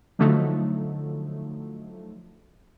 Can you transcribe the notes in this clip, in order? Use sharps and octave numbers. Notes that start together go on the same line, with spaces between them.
D3 F3 F#3 A3 D#4